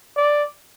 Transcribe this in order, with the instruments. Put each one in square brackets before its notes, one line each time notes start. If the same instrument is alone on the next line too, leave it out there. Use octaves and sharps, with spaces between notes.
[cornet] D5